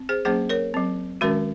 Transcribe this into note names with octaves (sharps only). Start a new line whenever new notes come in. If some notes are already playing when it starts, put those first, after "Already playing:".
Already playing: C4
G#4 C5
F#3 A#3 C#4 G#4 C5
A#4 C#5
F#3 C4
D#3 G#3 C#4 F#4 A#4